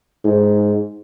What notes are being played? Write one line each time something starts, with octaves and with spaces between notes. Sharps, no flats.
G#2